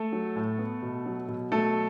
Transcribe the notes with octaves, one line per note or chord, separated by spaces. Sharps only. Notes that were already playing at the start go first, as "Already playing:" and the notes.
Already playing: A3 A4
F#3
A2
B3
B2
F#3
B2
F#3 A3 A4